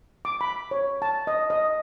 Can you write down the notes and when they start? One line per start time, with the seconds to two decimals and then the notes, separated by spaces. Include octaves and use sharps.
0.25 D6
0.41 B5
0.71 C#5
1.02 A5
1.27 D#5
1.50 D#5